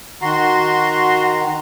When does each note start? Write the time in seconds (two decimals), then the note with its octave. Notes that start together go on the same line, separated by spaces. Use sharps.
0.22 D#3 F#4 A#5 C6